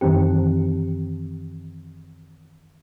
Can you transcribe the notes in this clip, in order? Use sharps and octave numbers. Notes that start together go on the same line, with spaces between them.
F#2 D#3 E3 C4 G4